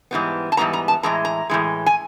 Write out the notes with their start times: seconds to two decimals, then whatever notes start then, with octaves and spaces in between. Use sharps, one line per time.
0.11 G#2 E3 G3 B3
0.52 A5
0.57 G#2 E3 G3 B3 A#5
0.73 A#5
0.88 A5
1.03 A2 E3 G#3 A#5
1.25 A#5
1.50 A2 E3 G#3
1.86 G#5